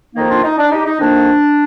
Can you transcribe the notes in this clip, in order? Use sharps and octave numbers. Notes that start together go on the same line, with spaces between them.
F2 D#3 A#3 D#4
D4 F4
D#4
D4
D#4 G4
D#4
F2 D#3 A#3 D4